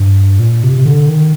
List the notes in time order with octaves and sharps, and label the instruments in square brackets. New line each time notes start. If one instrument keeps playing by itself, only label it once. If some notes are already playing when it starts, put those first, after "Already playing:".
Already playing: [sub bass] G2
A#2
C3
C3
D3
D#3